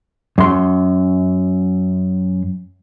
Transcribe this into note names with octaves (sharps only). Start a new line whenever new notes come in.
F#2 C6